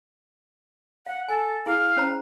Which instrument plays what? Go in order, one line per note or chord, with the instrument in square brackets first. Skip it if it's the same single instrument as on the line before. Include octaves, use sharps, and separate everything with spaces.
[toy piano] F5 [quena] F#5
[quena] A4 [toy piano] G#5
[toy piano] E4 G#4 [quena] F5
[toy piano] C#4 C5 A#5